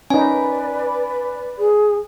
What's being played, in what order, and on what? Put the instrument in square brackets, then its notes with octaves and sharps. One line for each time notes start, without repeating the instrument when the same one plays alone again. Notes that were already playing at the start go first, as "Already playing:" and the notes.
[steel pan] C#4 D#4 [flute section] B4 D5 [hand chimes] G#5
[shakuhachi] G#4